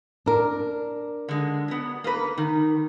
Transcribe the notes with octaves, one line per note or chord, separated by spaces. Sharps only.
D4 A#4
D3 G#3
F#3 B3
A#3 B4
D#3